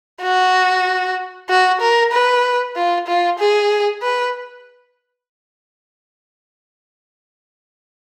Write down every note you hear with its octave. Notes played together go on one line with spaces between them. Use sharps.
F#4
F#4
A#4
B4
F4
F4
G#4
B4